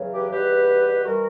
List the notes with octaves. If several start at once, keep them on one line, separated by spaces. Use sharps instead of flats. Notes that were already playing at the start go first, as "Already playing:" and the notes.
Already playing: E2 C#3 F#3
G4 B4
E2 B2 G3 G4 B4
E3 G3 F#4 A#4